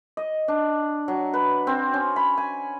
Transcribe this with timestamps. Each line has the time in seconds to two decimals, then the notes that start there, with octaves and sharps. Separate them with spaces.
0.17 D#5
0.48 D4
1.08 F#3
1.34 B4
1.67 C4
1.94 C#4
2.16 B5
2.38 G#5